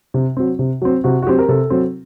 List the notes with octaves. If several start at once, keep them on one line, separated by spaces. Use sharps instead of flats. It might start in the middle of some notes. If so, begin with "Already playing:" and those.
C3
F#3 C4
C3
F#3 C4
C3 F#4
F#4
F#3 C4 G4
A#4
C3 A4
F#3 C4